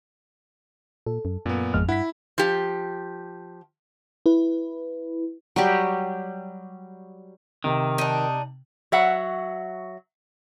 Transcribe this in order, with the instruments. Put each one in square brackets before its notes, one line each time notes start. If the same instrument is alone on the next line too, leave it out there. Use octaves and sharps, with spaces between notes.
[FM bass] A#2 [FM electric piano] A4
[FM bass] F#2
[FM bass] F#2 [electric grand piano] A#2 B3
[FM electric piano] G#1 F2 F6 [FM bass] G#3
[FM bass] G2 [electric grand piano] E4 B6 [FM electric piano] F#5
[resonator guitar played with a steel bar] F3 G4
[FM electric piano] E4 B4
[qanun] F#3 G3 G4
[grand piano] C3 [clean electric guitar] D#3
[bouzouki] D4 D#4
[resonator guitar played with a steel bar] F#3 E5 F#5